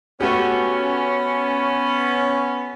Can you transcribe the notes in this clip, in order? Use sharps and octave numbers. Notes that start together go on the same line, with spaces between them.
A3 B3 C#4 F#4 G4